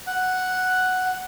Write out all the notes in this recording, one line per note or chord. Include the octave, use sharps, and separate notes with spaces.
F#5